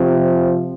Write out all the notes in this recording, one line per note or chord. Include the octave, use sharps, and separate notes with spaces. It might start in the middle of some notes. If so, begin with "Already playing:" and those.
Already playing: C3 F3